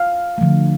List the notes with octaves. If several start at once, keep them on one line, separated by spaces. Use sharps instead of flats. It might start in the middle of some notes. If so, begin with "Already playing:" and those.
Already playing: F5
D3 F3 A3